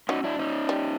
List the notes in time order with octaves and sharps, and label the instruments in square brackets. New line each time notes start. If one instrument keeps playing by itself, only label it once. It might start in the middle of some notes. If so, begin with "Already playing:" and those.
[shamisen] F#3 [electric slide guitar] C#4 D#4
[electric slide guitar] D4 E4
C#4 D#4
[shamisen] G3